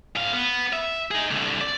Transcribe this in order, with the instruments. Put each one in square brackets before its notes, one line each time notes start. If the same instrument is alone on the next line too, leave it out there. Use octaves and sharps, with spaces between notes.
[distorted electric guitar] A2 F5
B3
E5
D#4 G#4
C2 D3
D5